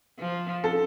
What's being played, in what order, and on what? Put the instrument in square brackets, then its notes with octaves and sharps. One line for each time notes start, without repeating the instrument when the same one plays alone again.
[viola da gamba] F3
[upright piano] A4